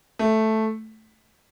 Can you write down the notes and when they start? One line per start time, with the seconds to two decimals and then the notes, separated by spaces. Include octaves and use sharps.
0.19 A3